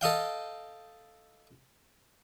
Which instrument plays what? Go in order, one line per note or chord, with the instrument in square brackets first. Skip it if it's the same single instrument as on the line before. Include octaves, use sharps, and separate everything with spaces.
[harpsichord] A4 D#5 F5 G5